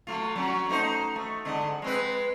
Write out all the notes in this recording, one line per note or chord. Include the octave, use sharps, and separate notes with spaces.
F#3 A3 F4
F#3 C#4 F#4
A3 D#4 C5
A3
G#2 D3 D#5
G#3 C4 B4